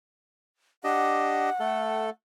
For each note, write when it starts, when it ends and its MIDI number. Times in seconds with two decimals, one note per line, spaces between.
0.84 1.50 62
0.84 1.50 67
0.84 1.50 75
0.84 2.07 78
1.60 2.10 57
1.60 2.10 69